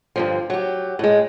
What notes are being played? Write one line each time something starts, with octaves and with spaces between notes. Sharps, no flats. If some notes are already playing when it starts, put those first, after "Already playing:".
G2 D3 F3
F#3 G4
A2 G#3